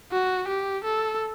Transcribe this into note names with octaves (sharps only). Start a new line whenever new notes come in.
F#4
G4
A4